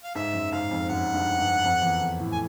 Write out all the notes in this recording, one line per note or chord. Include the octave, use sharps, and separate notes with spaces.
F5
G#2 E5
F#2
G#2 F5
F2
F#2 F#5
G2
G2
F2
E2
F2
A2
G#5